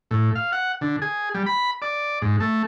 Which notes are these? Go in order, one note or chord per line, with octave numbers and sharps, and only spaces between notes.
A2
F5
F#5
D3
G#4
G3
B5
D5
G#2
A3